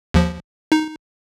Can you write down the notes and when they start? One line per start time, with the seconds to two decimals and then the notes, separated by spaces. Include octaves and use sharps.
0.14 D#2 F3
0.72 D#4